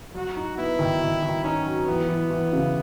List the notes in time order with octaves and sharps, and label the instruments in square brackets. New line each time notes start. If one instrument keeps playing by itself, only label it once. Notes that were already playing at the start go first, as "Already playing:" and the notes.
[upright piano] F#3 [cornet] F#4
[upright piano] D#4
[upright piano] B3 [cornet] E4
[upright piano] D#3
D#3
D#3
[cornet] C#4 [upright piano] D#4
[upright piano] F#3
[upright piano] E3 [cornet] B3
[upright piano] E3
E3
C#3